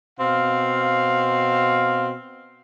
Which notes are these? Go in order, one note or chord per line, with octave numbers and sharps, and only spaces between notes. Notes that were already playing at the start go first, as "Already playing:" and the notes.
B2 C4 F5